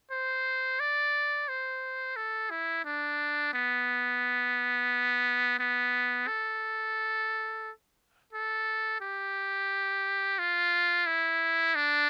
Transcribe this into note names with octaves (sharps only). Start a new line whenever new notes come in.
C5
D5
C5
A4
E4
D4
B3
B3
A4
A4
G4
F4
E4
D4